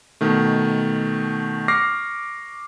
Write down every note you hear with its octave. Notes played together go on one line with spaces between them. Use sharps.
B2 D#3 A3
C#6 D6 F6 A#6 C7